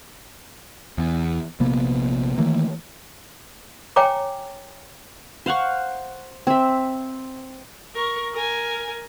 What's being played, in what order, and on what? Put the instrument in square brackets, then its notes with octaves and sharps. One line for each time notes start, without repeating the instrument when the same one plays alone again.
[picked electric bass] E2
A#1 C3 A#3 B3
D#3 E3 A3 A#3
[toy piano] C#5 G5 G#5 A#5 D6
[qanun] C5 F5 F#5 C#6
C4 E5
[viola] A#4 C#6
A#4 G#5